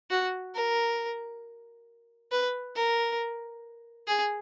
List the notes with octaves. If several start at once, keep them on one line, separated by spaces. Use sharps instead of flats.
F#4
A#4
B4
A#4
G#4